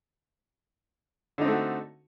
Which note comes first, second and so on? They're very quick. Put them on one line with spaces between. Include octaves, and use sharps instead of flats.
D3 D#4 C4 A3 F#4